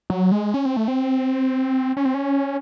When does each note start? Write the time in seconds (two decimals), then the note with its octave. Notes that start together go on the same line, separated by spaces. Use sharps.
0.10 F#3
0.32 G#3
0.54 C#4
0.65 C4
0.77 A3
0.88 C4
1.97 C#4
2.05 C4
2.14 C#4